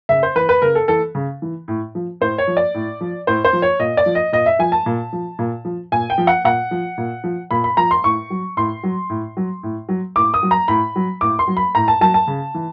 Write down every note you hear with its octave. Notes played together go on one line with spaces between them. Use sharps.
C#3 E5
C5
E3 B4
B4
C#3 A#4
A4
E3 A4
C#3
E3
A2
F3
A2 C5
C#5
F3
D5
A2
F3
A2 C5
C5
F3
C#5
A#2 D#5
D5
F3
D#5
A#2 D#5
E5
F3 G#5
A5
A#2
F3
A#2
F3
A#2 G#5
G5
F3
F#5
A#2 F#5
F3
A#2
F3
A#2 B5
B5
F3 A#5
C6
A2 C#6
F#3
A2 C6
F#3
A2
F#3
A2
F#3
A2 D6
D#6
F#3
A#5
A2 B5
F#3
A2 D6
C6
F#3
B5
A2 A#5
A5
F#3 A5
A5
C#3
E3